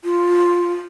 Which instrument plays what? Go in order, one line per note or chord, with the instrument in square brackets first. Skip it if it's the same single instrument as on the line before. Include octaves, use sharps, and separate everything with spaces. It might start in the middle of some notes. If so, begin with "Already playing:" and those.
[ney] F4